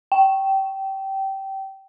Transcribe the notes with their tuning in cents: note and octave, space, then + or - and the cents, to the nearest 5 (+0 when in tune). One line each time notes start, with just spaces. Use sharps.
G5 -20